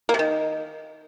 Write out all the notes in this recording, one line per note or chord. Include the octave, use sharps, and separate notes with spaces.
A#3
C3
D#3